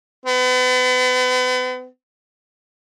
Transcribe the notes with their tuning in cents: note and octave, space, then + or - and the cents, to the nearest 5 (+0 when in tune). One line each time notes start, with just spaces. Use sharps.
B3 +40